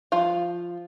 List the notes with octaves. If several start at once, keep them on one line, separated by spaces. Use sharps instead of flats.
F3 F4 F5